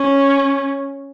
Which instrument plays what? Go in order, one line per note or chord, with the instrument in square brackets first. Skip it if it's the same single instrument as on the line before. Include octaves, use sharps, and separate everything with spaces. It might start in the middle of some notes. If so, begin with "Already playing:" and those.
Already playing: [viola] C#4